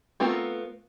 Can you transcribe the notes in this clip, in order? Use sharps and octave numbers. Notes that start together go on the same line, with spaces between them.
A3 B3 C4 F4 A#4